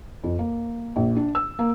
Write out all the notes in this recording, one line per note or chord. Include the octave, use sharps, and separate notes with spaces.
F2
A#3
A#1
D4
E6
A#3